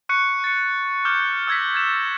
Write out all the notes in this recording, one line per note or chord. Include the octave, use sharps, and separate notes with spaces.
C#6 F#6 C#7
A6 C#7
D6 F6 G6
E6 F6 G#6 A#6 B6
G#6 A6 E7